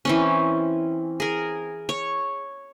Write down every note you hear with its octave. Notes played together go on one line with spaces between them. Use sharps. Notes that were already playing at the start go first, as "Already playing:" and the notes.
E3 C4 C#4
G#4 A#4
C#5